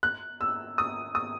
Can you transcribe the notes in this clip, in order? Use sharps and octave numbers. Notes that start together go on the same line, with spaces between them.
F#6
E6
D#6
D#6